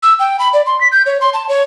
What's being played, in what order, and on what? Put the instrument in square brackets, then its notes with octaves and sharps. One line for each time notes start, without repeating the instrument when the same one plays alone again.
[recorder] E6
G5
B5
D5
C6
B6
G6
C#5
C6
A5
C#5